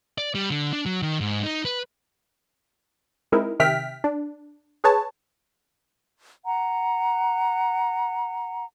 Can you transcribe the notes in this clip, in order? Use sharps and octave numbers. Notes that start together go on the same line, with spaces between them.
D5
G3
D3
D4
F#3
D#3
G#2
D#4
B4
G#3 C4 D#4 E4 A#4
C3 D#3 E5 G5 F6 B6
D4
G#4 B4 C#5 A5
F#5 A#5